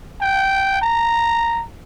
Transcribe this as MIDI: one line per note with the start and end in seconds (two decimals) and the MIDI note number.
0.21 0.77 79
0.82 1.64 82